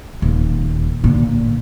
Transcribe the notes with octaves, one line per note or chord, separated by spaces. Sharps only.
D#1
A#2 D3